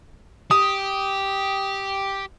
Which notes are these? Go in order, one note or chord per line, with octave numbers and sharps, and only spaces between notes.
G4 D#6